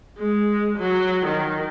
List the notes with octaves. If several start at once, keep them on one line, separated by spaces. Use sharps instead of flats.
G#3
F#3
D#3